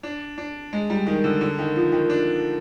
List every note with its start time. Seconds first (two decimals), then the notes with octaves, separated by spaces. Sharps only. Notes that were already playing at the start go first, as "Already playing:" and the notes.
0.03 D4
0.38 D4
0.73 G#3
0.90 G3
1.07 D#3
1.24 D3
1.41 D3
1.59 D#3
1.76 F3
1.92 D#3
2.10 D4